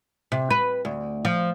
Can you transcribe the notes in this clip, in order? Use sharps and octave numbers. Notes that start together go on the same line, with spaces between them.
C3
B4
D2
F3